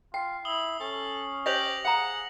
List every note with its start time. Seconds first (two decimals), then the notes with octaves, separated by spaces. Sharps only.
0.14 F4 G5 C7
0.45 E4 D#6 F#7 G7
0.80 C#4 A4
1.46 G4 C5 C#5 D#5 A#6 F7 F#7
1.85 G#4 F5 F#5 A#5